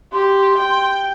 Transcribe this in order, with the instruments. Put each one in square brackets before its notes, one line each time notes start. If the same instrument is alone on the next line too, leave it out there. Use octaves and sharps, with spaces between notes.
[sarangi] G4 [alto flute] C6
[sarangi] G5